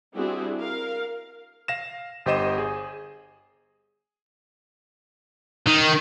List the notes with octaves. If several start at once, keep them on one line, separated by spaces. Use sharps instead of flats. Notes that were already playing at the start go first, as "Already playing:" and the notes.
G3 C4 D4 E4 F#4 G#4
A#4 F5
F5 A#6 E7
G1 G4 C5 D#5 D#7 E7
G#4
D#3